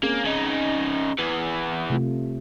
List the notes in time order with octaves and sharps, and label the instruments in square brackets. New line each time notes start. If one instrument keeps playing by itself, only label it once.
[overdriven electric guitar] A#3 [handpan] C4 C#4 G#4
[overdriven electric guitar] C#3 D#4
E2 E3
[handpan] C3 A3 F4